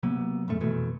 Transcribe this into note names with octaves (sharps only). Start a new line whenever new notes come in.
C3 F#3 A#3 B3
D#1 F2 G#2 A3
F1 B2 E3 A3